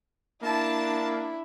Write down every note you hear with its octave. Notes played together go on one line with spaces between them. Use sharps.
A#3 D4 E4 A5